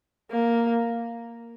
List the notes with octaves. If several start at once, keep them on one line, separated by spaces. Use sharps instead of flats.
A#3